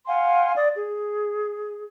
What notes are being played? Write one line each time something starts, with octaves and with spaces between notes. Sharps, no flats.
F5 F#5 G#5 C6
D5 D#6
G#4